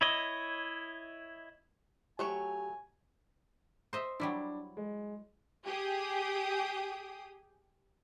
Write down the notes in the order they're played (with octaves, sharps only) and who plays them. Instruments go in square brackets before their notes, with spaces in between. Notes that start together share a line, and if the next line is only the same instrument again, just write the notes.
[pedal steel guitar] E4 C#5 D#5
[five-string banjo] F#3 A3 C#5 [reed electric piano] G4 [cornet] G#5
[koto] C5 D#5 E5
[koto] F#3 G3 E4 [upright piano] D4
[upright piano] G#3
[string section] G4 G#4 G5 D#6